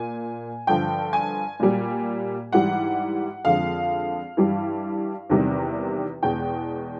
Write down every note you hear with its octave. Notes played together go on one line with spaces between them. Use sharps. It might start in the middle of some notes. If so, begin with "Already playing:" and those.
Already playing: A#2 G#5
G2 D3 F3 G5
G#5
A#2 G3
G#2 E3 G3 F#5
F2 D3 F3 G#3 F5
G2 E3 G3
E2 C3 D#3 G3
E2 B2 G#3 G5